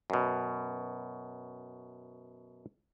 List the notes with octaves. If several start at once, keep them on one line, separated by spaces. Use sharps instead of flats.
F#2 B2